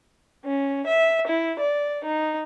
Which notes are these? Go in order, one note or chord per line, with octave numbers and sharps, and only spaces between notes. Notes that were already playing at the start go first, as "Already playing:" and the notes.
C#4
E5
E4
D5
D#4